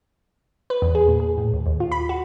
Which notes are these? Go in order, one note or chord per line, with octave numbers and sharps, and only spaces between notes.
B4
E2
G#4
A#2
G#4
A2
D#2
D#2
F4
B5
F#4